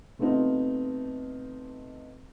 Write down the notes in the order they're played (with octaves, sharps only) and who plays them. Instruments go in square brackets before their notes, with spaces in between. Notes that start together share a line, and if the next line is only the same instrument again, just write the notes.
[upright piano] C3 A3 B3 C4 D#4 F4